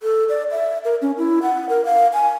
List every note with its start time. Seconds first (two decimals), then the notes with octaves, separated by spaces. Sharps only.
0.03 A4
0.29 D5
0.51 E5
0.85 A#4
1.02 C#4
1.18 E4
1.42 F#5
1.69 A#4
1.85 F5
2.13 G#5